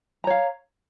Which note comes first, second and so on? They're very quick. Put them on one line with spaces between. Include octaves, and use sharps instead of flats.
A#5 C#5 F5